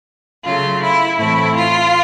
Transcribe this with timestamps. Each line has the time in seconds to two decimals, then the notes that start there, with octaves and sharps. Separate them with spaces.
0.44 C#3 F#3 A3 F4
0.81 E4
1.17 A2 E3 A3 C4 E4
1.55 F4